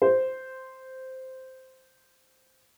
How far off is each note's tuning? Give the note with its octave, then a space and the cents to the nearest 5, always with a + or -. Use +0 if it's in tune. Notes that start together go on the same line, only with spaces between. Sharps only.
C5 -5